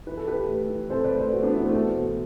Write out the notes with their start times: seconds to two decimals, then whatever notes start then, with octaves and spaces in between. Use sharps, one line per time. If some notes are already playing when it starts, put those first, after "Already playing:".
0.07 E3 B4
0.17 A4
0.27 E3 G4 B4
0.49 D2
0.69 E3
0.90 C3 A4 C5
1.04 B4 D5
1.11 D2
1.19 A4 C5
1.33 D2 F#4 A4
1.43 B3 D4
1.53 E3 C4 E4
1.64 A3 C4
1.74 B2 F#4 A4
1.95 E1